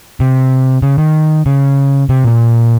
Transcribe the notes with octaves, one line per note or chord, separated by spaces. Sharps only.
C3
C#3
D#3
C#3
C3
A#2